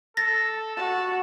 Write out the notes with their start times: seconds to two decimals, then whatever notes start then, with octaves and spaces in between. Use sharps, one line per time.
0.17 A4 A6 A#6
0.76 F#4 A5